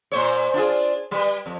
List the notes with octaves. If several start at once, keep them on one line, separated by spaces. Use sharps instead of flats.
A#2 C5 C#5
D4 F4 G#4
G3 B4
F2